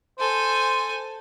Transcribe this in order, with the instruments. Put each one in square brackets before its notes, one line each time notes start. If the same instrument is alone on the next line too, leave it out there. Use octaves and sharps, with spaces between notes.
[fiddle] A4 G#5 [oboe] C5